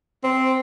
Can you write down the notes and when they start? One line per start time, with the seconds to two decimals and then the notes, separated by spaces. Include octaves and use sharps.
0.24 C4